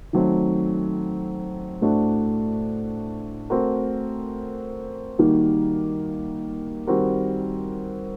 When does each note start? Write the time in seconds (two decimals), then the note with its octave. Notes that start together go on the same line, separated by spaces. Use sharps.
0.13 D#3 F#3 A3 C4
1.81 A2 A3 D4 F#4 C5
3.50 A3 C4 F#4 A#4
5.18 D#3 G3 A#3 D#4 F#4
6.87 D#3 G3 C4 F#4 A#4